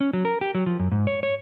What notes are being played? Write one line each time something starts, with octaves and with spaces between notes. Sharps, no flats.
C#4
F#3
A#4
G4
F#3
F3
F#2
G#2
C#5
C#5